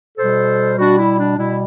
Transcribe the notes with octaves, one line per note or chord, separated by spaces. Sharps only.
B2 G3 A4 C5
B2 G3 D4 F#4
E4
D4
B2 G3 E4